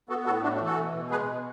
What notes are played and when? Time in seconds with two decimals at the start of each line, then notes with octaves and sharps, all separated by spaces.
0.09 B3 F#4 A4
0.26 A2 F#4 A4
0.43 A3 D4 F#4
0.54 D4 F#4
0.60 E3
0.66 F#4 A4
0.77 B2
0.94 B2
1.11 G#3 G#4 B4
1.28 B2